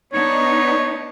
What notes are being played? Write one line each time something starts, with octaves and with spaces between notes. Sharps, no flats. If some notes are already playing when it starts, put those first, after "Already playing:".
B3 D4 D#4 C#5